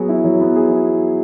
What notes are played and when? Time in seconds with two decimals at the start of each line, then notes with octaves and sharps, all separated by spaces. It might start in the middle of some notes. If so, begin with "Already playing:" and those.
Already playing: F#3 B3 G#4
0.09 E4
0.24 F#3
0.41 B3
0.56 G#4
0.71 E4